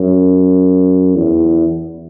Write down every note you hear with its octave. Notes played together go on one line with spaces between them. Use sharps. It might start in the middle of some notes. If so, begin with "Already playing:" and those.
Already playing: F#2
E2